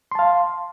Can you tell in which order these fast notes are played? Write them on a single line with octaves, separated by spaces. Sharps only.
C6 A5 F5